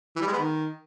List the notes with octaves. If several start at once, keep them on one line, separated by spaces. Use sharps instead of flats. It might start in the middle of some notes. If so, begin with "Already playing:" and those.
E3
G3
G#3
B3
D#3